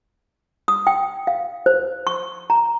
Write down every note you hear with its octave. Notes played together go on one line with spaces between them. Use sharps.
D#6
G5
F5
C5
C#6
A#5